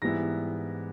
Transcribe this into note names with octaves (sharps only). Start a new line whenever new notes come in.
G#2 E3 G3 B3 E4 A#6